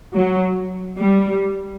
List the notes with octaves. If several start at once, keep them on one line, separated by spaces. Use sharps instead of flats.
F#3
G3